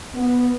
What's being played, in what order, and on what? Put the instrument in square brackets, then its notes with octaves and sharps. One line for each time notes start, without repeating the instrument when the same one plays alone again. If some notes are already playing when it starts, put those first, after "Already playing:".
[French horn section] B3